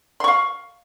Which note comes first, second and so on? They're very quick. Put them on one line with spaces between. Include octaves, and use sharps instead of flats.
C6 C#6 F5